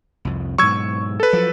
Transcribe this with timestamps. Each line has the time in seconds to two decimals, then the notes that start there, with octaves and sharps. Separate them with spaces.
0.25 C2 F2
0.58 G#2 B2 F#3 C#6 E6 G#6
1.20 A4 B4
1.33 F3 F#3